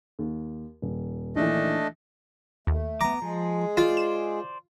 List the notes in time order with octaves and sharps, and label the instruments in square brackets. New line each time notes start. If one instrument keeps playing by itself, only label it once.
[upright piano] D#2
D#1
[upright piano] A#1 D#3 E3 [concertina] A3 D4 D#5
[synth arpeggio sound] D#2 [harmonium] A3
[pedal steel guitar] B3 D6 [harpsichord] A#5
[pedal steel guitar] F3 [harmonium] G#3 G#4
[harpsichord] F4 [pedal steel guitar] C5 D5 [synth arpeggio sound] A6
[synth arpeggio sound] E7